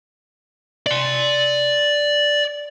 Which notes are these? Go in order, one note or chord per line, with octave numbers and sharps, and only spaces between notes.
D5 C6